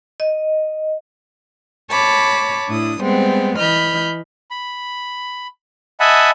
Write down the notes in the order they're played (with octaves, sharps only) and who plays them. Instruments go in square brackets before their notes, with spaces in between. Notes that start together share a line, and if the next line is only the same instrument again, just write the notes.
[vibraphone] D#5
[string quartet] C#5 A5 B5 D6
A2 D4 E4 D#6
G3 G#3 B3 C4
E3 D#5 B5 F6 G6
[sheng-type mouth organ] B5
D#5 E5 F#5 G#5 A5 B5